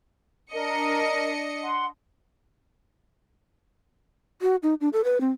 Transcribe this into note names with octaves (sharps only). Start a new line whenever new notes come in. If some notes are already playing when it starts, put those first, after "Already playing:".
D4 A#4 D#5 C#7
F#5 C6
F#4
D#4
D4
A4
B4
C4